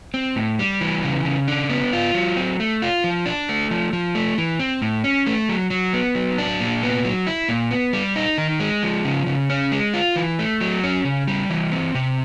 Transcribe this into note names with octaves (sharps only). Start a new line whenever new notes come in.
C4
A2
G3
E3
C#3
C#3
D4
B3
F4
F#3
C4
A3
F4
F3
D4
A3
F3
F3
A3
E3
C4
A2
C#4
A3
F#3
F#3
B3
F#3
D4
A#2
B3
F#3
E4
A#2
B3
G3
D#4
D#3
G#3
F3
C#3
C#3
C#4
G#3
F4
E3
A3
F#3
C#4
C#3
G3
E3
C4
C3